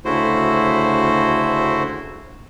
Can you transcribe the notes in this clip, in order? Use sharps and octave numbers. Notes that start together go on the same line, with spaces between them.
D2 C#3 A3 E4 F#4 C5